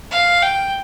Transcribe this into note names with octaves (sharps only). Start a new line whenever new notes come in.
F5
G5